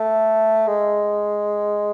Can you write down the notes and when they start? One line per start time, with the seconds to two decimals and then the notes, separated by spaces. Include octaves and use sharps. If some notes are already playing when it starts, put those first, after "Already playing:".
Already playing: A3
0.67 G#3